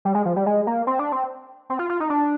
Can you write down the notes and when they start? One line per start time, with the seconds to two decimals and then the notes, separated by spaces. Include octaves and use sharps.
0.05 G3
0.15 G#3
0.25 F3
0.36 G3
0.46 G#3
0.67 A#3
0.87 C4
0.99 D4
1.12 C4
1.70 C4
1.79 F4
1.90 F4
2.00 D#4
2.10 D4